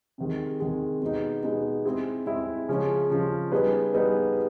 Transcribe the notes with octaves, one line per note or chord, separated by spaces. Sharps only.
C3 D#3 G#3
C3 D#3 G#3
B2 G#3 B3 D#4
B2 G#3 B3 D#4
G#3 C4 E4 G#4
G#3 C4 E4 G#4
C#3 F3 G#3 C#4
C#3 F3 G#3 C#4
G3 B3 D#4 G#4 B4
G3 B3 D#4 G#4 B4